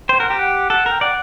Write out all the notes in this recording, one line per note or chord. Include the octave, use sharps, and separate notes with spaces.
C5 G5
A#4 F#5
G4 G5
F#5
A4 F#5
A#4
G5
D5 F#5